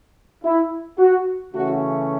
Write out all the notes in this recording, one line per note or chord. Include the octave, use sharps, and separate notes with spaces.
E4
F#4
C#3 E3 A3 C#4 F#4